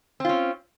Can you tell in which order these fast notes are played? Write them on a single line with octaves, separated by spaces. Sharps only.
C4 F4 C#4